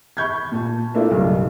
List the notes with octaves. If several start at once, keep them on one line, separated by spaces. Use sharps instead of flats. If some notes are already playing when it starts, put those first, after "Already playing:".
B5 C#6 G6 G#6
A#2 A5
A3 A#3 D4 E4 F4 A4
B1 G2 C#3 D#4